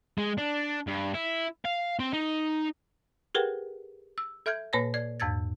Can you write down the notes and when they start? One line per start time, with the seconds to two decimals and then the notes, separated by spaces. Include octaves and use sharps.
0.18 G#3
0.38 D4
0.87 G2
1.14 E4
1.65 F5
1.99 C4
2.13 D#4
3.35 G4 G#4 A#4 B4 F#5 G5
4.18 E6
4.46 A4 E5 F6 G6 G#6
4.73 A#2 A#3 B4 C#5 A5 A#6
4.94 D5 G#6
5.20 E2 G#2 E6 G#6 A6